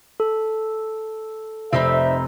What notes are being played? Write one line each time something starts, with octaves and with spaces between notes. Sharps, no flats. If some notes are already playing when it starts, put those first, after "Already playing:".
A4
F1 C4 D#4 C5 D5 E5 B5